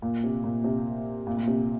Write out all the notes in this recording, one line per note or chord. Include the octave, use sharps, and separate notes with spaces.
A#2
C3
A#2
C3
A#2
A#2
C3